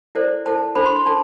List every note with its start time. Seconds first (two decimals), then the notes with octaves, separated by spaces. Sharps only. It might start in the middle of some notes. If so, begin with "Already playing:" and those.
0.15 E4 A4 C5 D5
0.45 E4 A4 C5 A5
0.75 D4 A4 C5 B5
0.86 C6
0.96 C6
1.06 D4 A4 A5